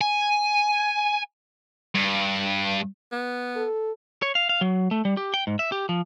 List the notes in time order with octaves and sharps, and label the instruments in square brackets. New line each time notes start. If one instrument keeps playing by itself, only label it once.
[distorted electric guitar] G#5
G2
[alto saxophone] B3
[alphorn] A4
[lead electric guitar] C#5
F5
F5
F#3
A3
G3
G4
G5
G#2
E5
G4
F3